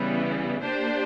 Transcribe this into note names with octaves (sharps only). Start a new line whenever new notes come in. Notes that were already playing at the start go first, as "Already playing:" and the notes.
Already playing: C#3 E3 G3 B3
A#3 D4 G4 C5